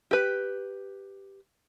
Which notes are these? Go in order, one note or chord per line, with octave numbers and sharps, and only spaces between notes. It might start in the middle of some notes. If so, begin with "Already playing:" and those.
G4 B4